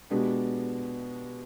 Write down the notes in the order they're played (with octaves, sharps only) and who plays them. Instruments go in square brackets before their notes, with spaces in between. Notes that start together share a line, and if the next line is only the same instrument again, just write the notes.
[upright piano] B2 G#3 B3 D4 G4